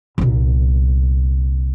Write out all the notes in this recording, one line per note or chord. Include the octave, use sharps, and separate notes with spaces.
C2 A#2